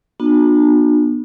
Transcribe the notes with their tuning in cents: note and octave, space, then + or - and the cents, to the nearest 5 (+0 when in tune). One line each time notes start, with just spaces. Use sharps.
B3 -30 D4 +35 F#4 -40